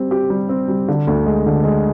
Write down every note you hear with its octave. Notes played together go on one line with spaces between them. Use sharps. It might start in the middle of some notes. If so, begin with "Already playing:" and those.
Already playing: G3 C4
G4
G3
C4
G3
D3
D2
G#3
D3
G#3